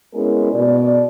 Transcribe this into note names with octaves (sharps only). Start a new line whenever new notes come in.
G#3 B3 C#4 E4 G#4 A#4
B2 D5